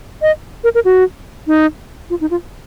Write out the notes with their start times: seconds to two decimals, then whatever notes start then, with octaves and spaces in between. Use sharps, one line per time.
0.22 D#5
0.64 A#4
0.75 A#4
0.85 F#4
1.47 D#4
2.10 F4
2.21 D#4
2.31 F4